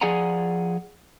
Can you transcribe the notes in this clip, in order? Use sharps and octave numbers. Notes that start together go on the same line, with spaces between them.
F3 G#4 D5 F#5 G#5 A#5